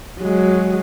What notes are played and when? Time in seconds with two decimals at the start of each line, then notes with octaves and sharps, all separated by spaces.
0.21 F#3 G#3